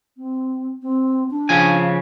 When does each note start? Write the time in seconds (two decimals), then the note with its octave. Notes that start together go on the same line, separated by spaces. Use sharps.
0.17 C4
0.82 C4
1.30 D4
1.49 C#3 F3 G#5